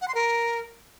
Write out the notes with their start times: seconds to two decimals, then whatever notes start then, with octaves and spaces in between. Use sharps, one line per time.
0.01 F#5
0.08 C6
0.15 A#4